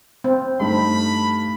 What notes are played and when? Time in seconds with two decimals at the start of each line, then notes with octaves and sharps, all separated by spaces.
0.24 C4
0.59 G2 A3 D#4 B5